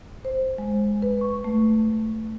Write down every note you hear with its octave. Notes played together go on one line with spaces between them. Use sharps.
C5
G#3
B4
C#6
A3